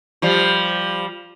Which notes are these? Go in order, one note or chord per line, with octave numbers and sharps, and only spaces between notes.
F3 G3